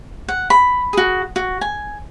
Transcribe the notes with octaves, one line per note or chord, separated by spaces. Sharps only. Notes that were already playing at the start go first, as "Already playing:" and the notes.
F#5
B5
F#4 G#4
F#4
G#5